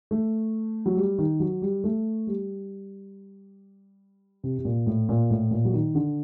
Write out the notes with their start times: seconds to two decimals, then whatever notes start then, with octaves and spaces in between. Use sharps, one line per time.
0.11 A3
0.86 F#3
0.97 G3
1.18 D#3
1.40 F#3
1.62 G3
1.84 A3
2.27 G3
4.44 C3
4.59 C3
4.65 A#2
4.87 A2
5.09 A#2
5.30 A2
5.51 A#2
5.65 F#3
5.74 D#3
5.95 D3